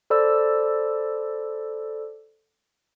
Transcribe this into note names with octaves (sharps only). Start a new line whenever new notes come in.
A4 C5 D5 B5 E6